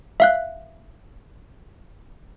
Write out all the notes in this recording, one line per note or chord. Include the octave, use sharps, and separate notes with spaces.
E5 F5 F#6